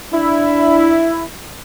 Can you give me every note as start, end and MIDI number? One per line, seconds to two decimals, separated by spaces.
0.13 1.11 62
0.13 1.23 64